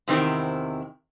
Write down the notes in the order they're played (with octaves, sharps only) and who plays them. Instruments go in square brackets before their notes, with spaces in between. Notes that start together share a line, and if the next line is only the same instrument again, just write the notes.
[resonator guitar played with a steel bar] E2 C3 D#3 C4 E4